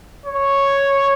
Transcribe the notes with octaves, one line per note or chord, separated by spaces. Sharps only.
C#5